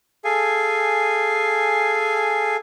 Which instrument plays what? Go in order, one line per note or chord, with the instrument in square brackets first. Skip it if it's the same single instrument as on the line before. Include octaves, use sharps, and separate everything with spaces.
[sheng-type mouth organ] G#4 A4 F5 G#5